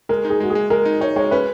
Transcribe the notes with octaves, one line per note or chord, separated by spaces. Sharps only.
G#3 A#4
D#4
G#4
G#3 F#4
G#4
G#3
G#3 A#4
D#4
D#4 C#5
G#3 C#5
C#4 B4